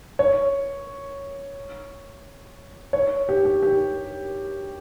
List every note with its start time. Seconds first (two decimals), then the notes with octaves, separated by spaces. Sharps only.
0.19 C#5
2.93 C#5
3.29 G4
3.45 G4
3.63 G4